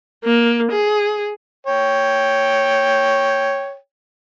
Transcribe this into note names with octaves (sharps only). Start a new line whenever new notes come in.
A#3
G#4
C#5 G5